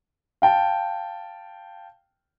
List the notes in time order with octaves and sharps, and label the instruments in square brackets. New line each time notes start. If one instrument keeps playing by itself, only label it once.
[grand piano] F5 G5 A5